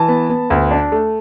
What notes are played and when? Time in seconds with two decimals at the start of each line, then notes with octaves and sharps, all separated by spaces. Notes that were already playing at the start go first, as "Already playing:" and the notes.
Already playing: E3 A5
0.08 B3
0.30 B3
0.50 D2
0.71 D4
0.92 A3